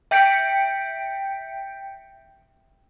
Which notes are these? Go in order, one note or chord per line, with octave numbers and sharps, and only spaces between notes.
E5 G5 G6 B6 C#7 D7